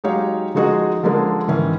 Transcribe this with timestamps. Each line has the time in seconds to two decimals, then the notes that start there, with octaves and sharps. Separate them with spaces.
0.04 F#3 G#3 D#4 G4 C#5 F5
0.55 F3 G#3 D#4 F#4 G#4 D#5
1.03 D3 F3 G#3 C#4 D4 A#4
1.47 G#2 D#3 E3 C#4